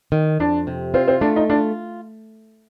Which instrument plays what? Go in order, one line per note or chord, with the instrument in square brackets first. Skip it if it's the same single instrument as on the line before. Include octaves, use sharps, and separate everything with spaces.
[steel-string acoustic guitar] D#3
[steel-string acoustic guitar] F2 [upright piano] D4
[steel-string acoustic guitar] C3
[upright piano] C4 [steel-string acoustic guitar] F4
[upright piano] C4
[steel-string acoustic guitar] A3 [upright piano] D4
[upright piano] D#4
[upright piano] D4 [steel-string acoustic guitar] F4